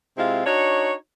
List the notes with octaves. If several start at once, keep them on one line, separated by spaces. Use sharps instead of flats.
C3 G#3 C4 E4 F4
D4 D#4 F#4 C#5